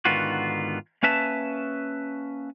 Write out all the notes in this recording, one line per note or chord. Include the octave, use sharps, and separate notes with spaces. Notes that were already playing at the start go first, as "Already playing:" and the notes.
G#2 D3 D#3 B3 F4 F#4
A#3 C#4 B4 E5 A5